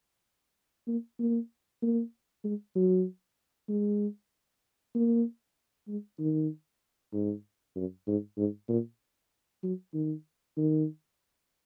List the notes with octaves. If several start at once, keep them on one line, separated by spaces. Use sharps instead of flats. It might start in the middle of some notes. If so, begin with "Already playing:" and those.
A#3
A#3
A#3
G#3
F#3
G#3
A#3
G#3
D#3
G#2
F#2
G#2
G#2
A#2
F#3
D#3
D#3